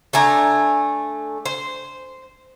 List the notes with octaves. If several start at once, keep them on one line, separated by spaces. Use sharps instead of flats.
A3 D4 G#5 A#5
C5